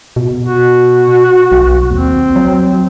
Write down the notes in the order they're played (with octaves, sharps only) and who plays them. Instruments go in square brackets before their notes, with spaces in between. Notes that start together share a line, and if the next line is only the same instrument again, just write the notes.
[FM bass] B2
[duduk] F#4
[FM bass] B1
[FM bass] D#2 [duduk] C4
[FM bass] F#3